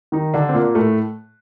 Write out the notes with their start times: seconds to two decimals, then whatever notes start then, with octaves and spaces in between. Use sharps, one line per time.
0.12 D#3 D#4
0.34 D3 D4
0.49 C4
0.54 A#2 A#3
0.75 A2 A3